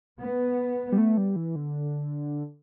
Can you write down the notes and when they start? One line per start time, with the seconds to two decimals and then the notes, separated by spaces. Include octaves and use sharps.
0.20 B3
0.92 G3
0.98 A3
1.18 G3
1.36 E3
1.56 D3